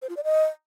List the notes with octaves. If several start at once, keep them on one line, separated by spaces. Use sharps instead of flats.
C5
F4
D5
D#5